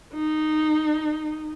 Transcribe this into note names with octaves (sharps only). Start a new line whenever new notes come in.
D#4